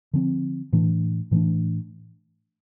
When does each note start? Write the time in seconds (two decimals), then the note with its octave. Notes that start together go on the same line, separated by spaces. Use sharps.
0.14 D3 F3 C4
0.73 A2 E3 A3 D4
1.31 A2 E3 A3 D4